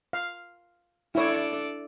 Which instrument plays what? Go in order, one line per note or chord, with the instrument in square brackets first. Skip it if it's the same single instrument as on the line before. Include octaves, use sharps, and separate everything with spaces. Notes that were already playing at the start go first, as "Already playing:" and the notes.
[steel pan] F5
[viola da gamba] D4 A4 D5 [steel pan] E4 C#5